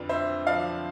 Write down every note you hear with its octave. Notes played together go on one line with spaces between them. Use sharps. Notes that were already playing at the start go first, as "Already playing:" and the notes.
Already playing: F2 D3 F4 B4 D5
C4 C5 E5
F3 D5 F5